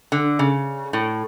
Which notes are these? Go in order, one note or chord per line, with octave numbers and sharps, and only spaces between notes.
D3
C#3
A2